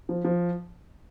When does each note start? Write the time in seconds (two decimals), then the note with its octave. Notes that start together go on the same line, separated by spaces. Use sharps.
0.09 F3
0.25 F3